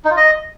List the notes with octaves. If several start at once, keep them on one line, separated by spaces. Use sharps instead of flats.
D#4
F4
D#5